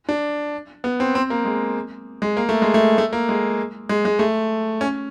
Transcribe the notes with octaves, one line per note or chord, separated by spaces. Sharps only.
D4
B3
C4
C4
A#3
G#3
G#3
A#3
A3
G#3
A3
A3
A#3
G#3
G#3
G#3
A3
C#4